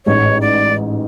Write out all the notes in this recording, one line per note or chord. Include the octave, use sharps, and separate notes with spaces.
A1 G#2 G#3 C#5
D5